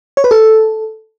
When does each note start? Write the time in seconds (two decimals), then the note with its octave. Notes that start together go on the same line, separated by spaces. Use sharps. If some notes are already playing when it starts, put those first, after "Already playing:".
0.17 C#5
0.24 B4
0.31 A4